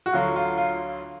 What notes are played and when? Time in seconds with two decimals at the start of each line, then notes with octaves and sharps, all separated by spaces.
0.06 F#4
0.13 D2 D3 F#3 F4
0.36 F4
0.58 F4